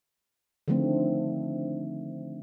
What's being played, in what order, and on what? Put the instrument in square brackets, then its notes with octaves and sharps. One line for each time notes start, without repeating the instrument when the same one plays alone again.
[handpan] D3 D#3 F3 A3 C4